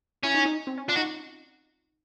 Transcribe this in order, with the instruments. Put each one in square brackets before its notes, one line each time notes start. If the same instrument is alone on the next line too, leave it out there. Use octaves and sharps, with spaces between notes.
[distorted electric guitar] C#4 [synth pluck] E4
[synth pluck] D#4
D#4
C4
C#4
[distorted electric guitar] D4 [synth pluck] F4
[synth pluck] D#4 [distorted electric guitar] F#4